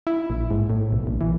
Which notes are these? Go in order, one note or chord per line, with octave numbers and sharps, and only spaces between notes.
E4
A#1
G#2
A2
B1
A#1
E3